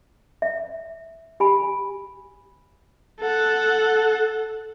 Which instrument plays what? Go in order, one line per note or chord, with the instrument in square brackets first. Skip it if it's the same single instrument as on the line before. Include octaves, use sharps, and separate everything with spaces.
[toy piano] E5
G4 G#5 B5
[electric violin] A4 F#5